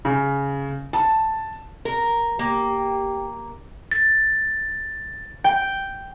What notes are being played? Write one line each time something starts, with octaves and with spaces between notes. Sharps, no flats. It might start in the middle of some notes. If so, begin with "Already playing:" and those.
C#3
A5
A#4
A#3 G4
A6
G5